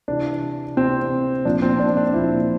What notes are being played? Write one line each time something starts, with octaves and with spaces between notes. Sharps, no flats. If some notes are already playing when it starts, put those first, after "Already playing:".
C3 E3 D4
C3 E3 C4
A#2 F3 D4
C4
D4
D4
A#2 F3 E4